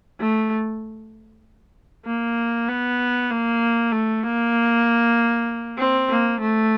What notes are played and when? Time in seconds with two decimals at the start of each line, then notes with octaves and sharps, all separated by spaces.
0.20 A3
2.06 A#3
2.69 B3
3.31 A#3
3.92 A3
4.23 A#3
5.78 C4
6.10 A#3
6.40 A3